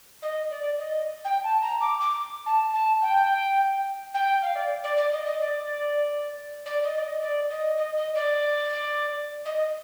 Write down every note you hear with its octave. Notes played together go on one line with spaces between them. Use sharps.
D#5
D5
D#5
G5
A5
A#5
D6
D6
A5
A5
G5
G5
F5
D5
D5
D5
D#5
D#5
D5
D5
D#5
D5
D#5
D5
D#5
D#5
D#5
D5
D#5